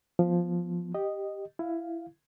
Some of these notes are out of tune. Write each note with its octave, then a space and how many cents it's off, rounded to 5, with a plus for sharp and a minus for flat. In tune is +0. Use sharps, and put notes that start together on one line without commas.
F3 +0 B3 +0
G4 +0 D#5 -10
E4 +15 F5 +0